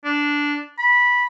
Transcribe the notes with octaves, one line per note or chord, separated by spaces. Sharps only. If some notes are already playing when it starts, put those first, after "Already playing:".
D4
B5